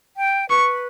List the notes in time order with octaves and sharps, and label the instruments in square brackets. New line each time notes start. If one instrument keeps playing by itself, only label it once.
[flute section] G5
[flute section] B4 [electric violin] C#6